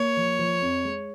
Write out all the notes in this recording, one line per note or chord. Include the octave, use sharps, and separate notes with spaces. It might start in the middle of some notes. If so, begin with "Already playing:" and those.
Already playing: A#3 C#5
F3
F3
F2
G#3